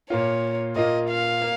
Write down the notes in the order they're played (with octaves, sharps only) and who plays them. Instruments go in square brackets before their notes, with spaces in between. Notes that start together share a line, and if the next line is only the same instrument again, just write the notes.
[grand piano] A#2 A#3 F4 [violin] C#5
[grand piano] A#2 A#3 F4 [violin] D#5
[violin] F5
[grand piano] A#3